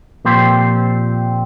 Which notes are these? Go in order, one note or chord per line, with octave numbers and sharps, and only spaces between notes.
A#2 F3 C4 G4 C5